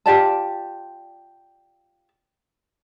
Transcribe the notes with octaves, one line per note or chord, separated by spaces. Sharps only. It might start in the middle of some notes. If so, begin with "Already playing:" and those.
F4 G4 D5 A5